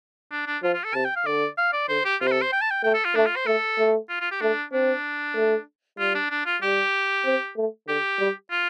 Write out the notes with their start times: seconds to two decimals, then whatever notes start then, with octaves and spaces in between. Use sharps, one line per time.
0.31 D4
0.47 D4
0.63 F3 F4
0.74 F4
0.84 A4
0.94 C3 A5
1.05 G5
1.16 F5
1.26 D3 D5
1.58 F5
1.73 D5
1.89 D3 C5
2.05 G4
2.21 C3 F4
2.27 C5
2.32 A4
2.42 C5
2.53 G5
2.61 A5
2.71 G5
2.84 A3 G5
2.94 A4
3.05 F4
3.15 A3 D4
3.26 F4
3.36 C5
3.47 A3 A4
3.78 A3
4.09 F4
4.20 F4
4.31 G4
4.41 A3 D4
4.73 C4 D4
5.36 A3
5.99 G3 F4
6.15 D4
6.31 D4
6.46 F4
6.62 G3 G4
7.26 C4
7.57 A3
7.88 D3 G4
8.19 G3
8.51 F4